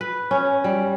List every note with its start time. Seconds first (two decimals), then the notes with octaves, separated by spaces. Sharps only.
0.01 B4
0.31 C#4
0.64 G3